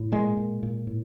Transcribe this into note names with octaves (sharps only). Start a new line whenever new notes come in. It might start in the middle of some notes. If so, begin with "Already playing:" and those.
Already playing: A2
A#2 G#3
A#2
A#2
A2